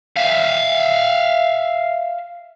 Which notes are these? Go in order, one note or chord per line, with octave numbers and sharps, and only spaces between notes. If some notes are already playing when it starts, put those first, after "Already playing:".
E5 F5